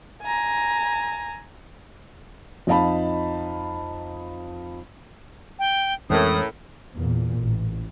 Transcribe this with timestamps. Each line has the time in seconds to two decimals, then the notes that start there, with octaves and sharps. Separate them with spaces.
0.23 G#5 A#5
2.67 F2 D#4 D#5 F5 A5 B5
5.59 G5
6.10 F2 A2 E3 G#3 C4 C#4 A#4 D#6
6.95 E2 A#2
7.39 A1